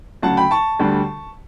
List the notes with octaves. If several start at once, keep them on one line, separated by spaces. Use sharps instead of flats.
D2 C#3 F#3 F#5 A5
G5 B5
A5 C#6
D2 D3 G3